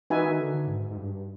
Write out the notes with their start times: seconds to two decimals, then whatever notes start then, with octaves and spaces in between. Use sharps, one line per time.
0.10 E3 D#4 F#4 B4 E5 G#5
0.25 D#3
0.39 D3
0.54 D3
0.68 G#2
0.91 G#2
0.97 G2